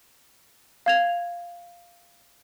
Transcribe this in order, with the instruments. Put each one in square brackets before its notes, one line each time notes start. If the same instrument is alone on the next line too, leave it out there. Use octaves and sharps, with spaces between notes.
[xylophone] F5 G#6 F7